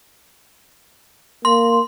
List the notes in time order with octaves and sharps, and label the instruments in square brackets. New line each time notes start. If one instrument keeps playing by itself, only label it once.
[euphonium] A#3 [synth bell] C6